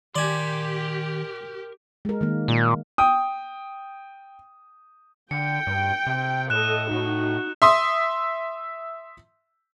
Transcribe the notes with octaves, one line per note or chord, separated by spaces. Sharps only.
D#3 G4 A#4 D5 G#5 C6
G#3 A#4
D#3 G#3 A#3
A#2
G5 D#6
D3 G5 C#7
G2
C3
A2 A4 D#5 F#6 E7
A2 D#4 F#4
E5 C6 D#6